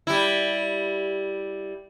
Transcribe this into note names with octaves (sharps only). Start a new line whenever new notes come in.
G3 E4